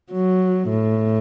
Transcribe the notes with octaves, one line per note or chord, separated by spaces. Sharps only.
F#3
A2